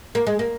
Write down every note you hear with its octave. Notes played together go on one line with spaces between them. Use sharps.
A#3
G#3
A#3